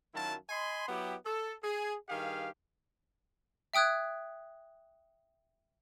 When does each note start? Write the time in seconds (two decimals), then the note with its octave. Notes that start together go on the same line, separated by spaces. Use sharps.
0.14 F#2 D#3 F#3 E4 F4 A5
0.49 D#5 G#5 B5 C6
0.88 F#3 B3 E4 G4
1.25 A4
1.63 G#4
2.09 G2 D#3 G4 G#4 F5
3.74 E5 G5 D#6 F#6 G#6